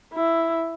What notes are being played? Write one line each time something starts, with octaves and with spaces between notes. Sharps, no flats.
E4